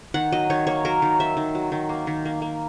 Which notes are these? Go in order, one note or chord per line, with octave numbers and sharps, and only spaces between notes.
D#3 F#5
F#3 D#5
D#3 C#5
A#3 C#5
F#3 A#4
D#3
D#3 E5
D#3
F#3
D#3
A#3
D#3
A#3
A#3